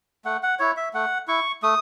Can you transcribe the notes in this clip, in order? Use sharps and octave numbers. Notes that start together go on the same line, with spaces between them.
A3 F#5
F#5
E4 C#5
E5
A3 F#5
E4 C#6
A3 D#6